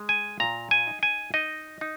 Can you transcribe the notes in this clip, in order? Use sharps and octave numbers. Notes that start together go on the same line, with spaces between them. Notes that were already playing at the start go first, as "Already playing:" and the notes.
Already playing: G#3
G#5
A#2 A#5
G#5
D#4
G#5
D#4 D#5
D#4